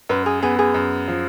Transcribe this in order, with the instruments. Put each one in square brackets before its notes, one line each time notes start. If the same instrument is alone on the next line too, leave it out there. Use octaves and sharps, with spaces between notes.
[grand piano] F#2 [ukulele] B4
[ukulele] G#4
[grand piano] B3 [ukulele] G#4
[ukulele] G#4
[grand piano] F#2
F3